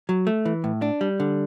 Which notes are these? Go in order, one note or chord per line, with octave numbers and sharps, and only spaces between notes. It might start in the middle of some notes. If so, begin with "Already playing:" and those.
F#3
A3
E3
A2
D4
G3
D3